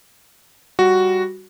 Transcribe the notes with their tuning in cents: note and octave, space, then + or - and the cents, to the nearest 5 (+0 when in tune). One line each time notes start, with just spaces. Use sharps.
G3 -5 F#4 +0